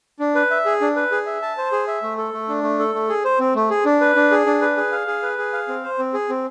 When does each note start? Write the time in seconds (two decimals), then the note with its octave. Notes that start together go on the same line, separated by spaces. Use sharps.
0.19 D4
0.35 B4
0.50 E5
0.66 G#4
0.81 D4
0.96 B4
1.11 G#4
1.26 E5
1.42 A5
1.57 C5
1.72 G#4
1.87 E5
2.02 A3
2.18 A4
2.33 A3
2.49 D4
2.63 A3
2.79 A4
2.95 A3
3.09 G#4
3.25 C5
3.39 C4
3.55 A3
3.70 G#4
3.85 D4
4.01 B4
4.15 D4
4.31 G#4
4.46 D4
4.61 B4
4.77 G#4
4.92 F5
5.07 G#4
5.22 B4
5.38 G#4
5.53 F5
5.68 C4
5.84 C5
5.99 C4
6.13 G#4
6.29 C4